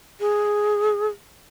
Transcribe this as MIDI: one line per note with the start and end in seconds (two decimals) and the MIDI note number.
0.20 1.08 68